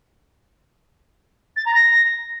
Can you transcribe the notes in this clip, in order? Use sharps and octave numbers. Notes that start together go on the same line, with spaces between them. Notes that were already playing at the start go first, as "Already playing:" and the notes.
A6
A#5
A#6